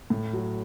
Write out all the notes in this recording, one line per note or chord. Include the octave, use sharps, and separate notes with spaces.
A2
F#3